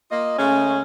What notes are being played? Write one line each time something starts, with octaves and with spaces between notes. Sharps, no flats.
A#3 F4 D#5
C#3 G#3 A3 C#4